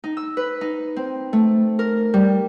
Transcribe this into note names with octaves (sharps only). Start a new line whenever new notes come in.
D#4
E6
B4
D#4
C4
A3
A#4
G3